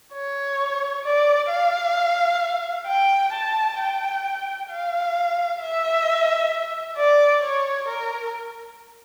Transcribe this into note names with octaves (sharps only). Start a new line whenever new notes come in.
C#5
D5
F5
G5
A5
G5
F5
E5
D5
C#5
A#4